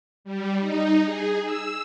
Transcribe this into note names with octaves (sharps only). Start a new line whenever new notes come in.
G3
D#4
G#4
E6